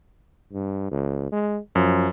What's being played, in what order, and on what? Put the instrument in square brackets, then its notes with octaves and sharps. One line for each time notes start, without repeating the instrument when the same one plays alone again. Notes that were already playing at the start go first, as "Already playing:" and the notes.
[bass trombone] G2
C#2
G#3
[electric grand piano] F#2 [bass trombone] F3